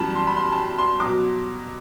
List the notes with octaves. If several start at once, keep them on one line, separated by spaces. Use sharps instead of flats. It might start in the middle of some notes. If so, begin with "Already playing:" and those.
Already playing: F#2 E3 G3 A5 B5
C6
B5
C6
A5
B5
C6
B2 F#3 D6